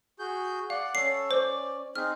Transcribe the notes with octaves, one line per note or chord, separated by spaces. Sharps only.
F#4 G#4 G6
D5 F5 F#5
C#4 A4 C#5 C7
C#4 C5 D5 D6
C4 D#4 G#4 F6